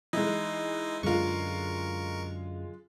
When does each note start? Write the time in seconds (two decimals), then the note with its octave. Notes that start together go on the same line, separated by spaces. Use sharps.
0.13 E3 G#3 D#4 E4 D#5
1.03 F#2 D3 G#3 F4 A#4 C#6